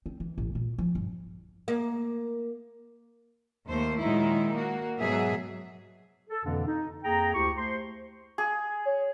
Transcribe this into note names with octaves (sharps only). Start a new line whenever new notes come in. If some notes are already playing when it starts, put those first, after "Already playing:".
C4
E3
A1
A#2
F3
G2
A#3
D#2 A3 A#3 C5
A#2 D#3 F#3 G#3 D#4 E4
A#3 F#4
G#2 B2 F#3 G#4 E5
A4
F2 B2 D3 E3 A#3 D4
D#4
F2 A#3 G#4 G5 A#5
D2 E4 G4 C#6
A3 C5 C6
G#4
C#5